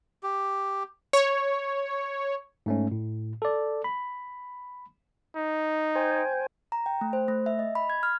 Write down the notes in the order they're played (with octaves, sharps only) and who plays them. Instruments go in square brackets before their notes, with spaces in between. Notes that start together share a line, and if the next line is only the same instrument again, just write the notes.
[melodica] G4
[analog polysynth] C#5
[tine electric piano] G#2 A3 C#4
A2
A4 D5
B5
[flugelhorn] D#4
[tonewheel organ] C5 G5 G#5
[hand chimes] A#5
G5
A3
C5
A3
E5
D#5
B5
G#6
F6